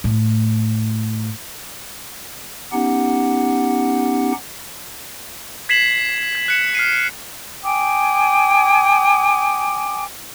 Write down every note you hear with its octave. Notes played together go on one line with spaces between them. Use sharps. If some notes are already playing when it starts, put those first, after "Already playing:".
A2
B3 C#4 D#4 G4 F#5
G#6 B6 C7 E7 F#7
G#6
F#6 C#7 E7
F6 C7 D#7
G5 G#5 D6 D#6